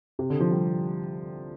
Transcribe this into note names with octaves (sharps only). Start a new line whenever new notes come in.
C3
D3
F3
G3